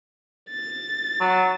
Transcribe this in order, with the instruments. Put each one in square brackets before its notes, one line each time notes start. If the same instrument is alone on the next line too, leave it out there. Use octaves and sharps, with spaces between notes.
[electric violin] A6
[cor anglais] F#3